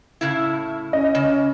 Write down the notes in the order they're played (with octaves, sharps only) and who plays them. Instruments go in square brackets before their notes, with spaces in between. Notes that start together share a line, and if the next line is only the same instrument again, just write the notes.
[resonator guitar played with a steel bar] A2 C#3 E4
[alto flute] C#4 [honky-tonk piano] D#5
[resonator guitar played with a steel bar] C#3